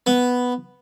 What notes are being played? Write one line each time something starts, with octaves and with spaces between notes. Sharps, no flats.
B3